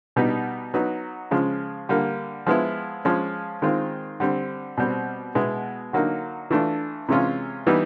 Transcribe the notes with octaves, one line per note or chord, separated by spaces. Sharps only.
B2 G3 B3 D#4
F#3 B3 D#4
C#3 F3 G#3
D3 G3 A#3
F3 G#3 B3 E4
F3 G#3 C#4
D#3 G#3 C4 F4
D3 G3 C4
B2 G3 C4
B2 G#3 B3 E4
D3 F#3 A#3 D#4
E3 A3 D4 F4
C3 E3 G#3 C#4 F4
E3 G3 B3 D#4